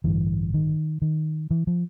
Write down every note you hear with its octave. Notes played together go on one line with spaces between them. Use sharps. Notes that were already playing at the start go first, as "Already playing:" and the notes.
A1 G2 D3 E3
D#3
D#3
E3
F3